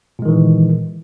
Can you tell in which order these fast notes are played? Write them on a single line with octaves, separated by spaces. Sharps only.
A#2 G#3 D#3 E3